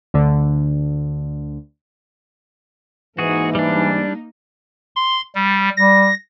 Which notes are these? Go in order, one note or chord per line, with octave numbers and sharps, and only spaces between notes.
D2 D3
G#2 E3 A#3 D#4 F#4 G#4
G3 D4
C6
G3
G3 A#6